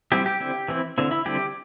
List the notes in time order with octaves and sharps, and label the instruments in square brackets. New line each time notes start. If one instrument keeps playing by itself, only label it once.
[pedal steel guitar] G3 C4 E4 G4
G4
D3 C4 E4
E3 C4 E4
D3 C4 E4
E4
D3 G3 C4 E4 G4